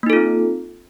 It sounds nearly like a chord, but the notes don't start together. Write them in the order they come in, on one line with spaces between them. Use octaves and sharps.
A#3 D#4 A4 F4 C4